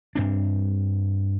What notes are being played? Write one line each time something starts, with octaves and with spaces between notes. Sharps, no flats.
G2 C4 D4